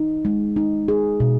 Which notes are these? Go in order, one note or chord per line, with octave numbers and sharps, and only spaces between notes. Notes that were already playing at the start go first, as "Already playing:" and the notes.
Already playing: D#4
G#3
D#4
G#4
B2